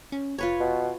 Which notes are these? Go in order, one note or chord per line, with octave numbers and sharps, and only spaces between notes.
C#4
F1 F4 B4 C#5
B2